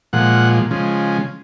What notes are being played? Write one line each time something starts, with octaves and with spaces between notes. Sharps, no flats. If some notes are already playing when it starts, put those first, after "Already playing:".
A#2 F3 G#3 F#5
C#3 F3 G#3